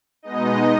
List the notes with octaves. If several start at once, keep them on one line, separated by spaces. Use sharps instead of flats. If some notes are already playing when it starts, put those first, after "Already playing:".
B2 G#3 B3 D#4 D#5